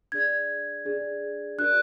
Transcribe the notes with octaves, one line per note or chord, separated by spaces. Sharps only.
D4 G#4 D5 G#6
D4 G#4 D5
D4 F#4 A#4 D5 F#6